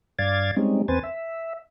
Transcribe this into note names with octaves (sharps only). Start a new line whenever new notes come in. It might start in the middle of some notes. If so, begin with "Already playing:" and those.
G2 D5 F5 G#6 A6
G3 G#3 C4 C#4 D#4
E2 C4 B4 C5 G#5 A6
E5